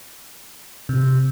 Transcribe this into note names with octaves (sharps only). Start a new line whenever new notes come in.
C3